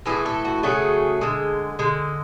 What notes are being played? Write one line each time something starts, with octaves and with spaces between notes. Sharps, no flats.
A2 E3 A3 G#4
A4
F#4
C#3 F#3 A3 G#4
D3 G#3
D3 G#3